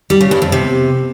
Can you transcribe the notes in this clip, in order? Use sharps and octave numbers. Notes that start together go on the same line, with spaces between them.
G3
C#3
G2
F2
C3